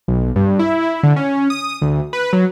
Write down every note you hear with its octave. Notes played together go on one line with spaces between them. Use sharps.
B1
G2
E4
D3
C#4
D#6
D2
B4
F#3